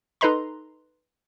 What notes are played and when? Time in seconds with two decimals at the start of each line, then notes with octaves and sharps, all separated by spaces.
0.21 D#4 A4 B4 D#5 A#5 C6